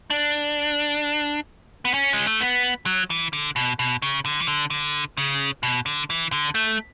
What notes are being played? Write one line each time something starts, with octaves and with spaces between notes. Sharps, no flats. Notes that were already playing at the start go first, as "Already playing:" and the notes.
D4
B3
C#4
G#3
A3
B3
F#3
E3
D3
B2
B2
C#3
D3
E3
D3
D3
C#3
B2
D3
E3
D3
A3